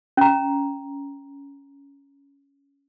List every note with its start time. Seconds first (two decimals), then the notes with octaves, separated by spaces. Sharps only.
0.17 C#4 A#5